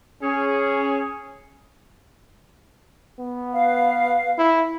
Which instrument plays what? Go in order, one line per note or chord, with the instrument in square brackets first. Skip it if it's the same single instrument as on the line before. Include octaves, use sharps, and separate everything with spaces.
[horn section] C#4 G#4
[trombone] B3
[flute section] B4 F5
[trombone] E4